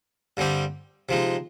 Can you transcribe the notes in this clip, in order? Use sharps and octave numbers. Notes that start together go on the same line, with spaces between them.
G2 D3 G3 C4 G4
C3 F3 G#3 D#4